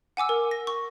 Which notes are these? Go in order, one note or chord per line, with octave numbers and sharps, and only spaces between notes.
F#5 G#5 D6 E6
A#4
A#6
C#6